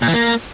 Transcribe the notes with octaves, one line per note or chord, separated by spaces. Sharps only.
A#2
E3
A#3